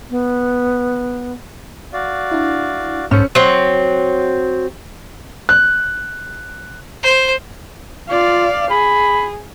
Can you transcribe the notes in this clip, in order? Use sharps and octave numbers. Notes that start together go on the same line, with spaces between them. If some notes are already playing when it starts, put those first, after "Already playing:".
B3
F#4 D5 F5
D4 E4
B1 G#2 C#4 A4 C5 C#7
F#3 C4
F#6
C5
F4 D5 F5
G#4 B5